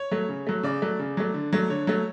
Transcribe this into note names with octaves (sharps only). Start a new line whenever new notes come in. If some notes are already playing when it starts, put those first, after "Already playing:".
Already playing: C#5
F#3 A3
C#3
F#3 A3
C#3 D5
F#3 A3
C#3
F#3 A3
D3
F#3 A3
D3 C#5
F#3 A3